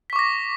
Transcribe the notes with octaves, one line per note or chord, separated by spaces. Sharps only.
C#6 D6 A#6 B6